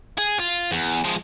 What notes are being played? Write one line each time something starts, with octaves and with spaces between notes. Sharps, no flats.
G#4
F4
E2
F3 G#3